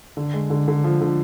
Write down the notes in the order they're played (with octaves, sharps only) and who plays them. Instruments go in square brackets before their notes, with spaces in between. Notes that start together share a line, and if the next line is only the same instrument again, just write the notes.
[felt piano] D3
G#3
D3
D3
F3
D3